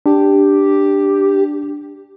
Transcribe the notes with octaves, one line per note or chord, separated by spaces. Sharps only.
D4 G4